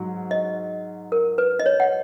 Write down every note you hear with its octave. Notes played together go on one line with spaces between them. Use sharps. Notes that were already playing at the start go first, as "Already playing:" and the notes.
Already playing: G#2 F#3
D#5
A#4
B4
D#5
C#5
F#5